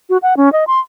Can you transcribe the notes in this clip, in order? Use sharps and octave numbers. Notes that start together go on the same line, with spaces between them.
F#4
F#5
C#4
D#5
C6